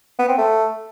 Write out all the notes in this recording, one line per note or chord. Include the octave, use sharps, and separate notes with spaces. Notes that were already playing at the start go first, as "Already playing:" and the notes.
B3
C4
A3